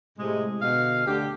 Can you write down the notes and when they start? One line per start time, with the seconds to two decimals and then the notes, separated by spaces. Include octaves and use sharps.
0.18 A2 C3 G#3
0.61 B2 D3 D#5 F5
1.06 D2 D3 G4